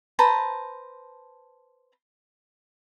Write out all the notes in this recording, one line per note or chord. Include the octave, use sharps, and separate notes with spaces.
B4 C5 A5 A#5